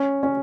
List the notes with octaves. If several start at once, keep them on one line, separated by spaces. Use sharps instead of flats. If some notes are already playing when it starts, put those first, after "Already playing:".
Already playing: C#4
C#4